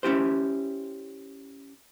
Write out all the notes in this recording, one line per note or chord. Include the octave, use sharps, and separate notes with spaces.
C#4 E4 G4 C5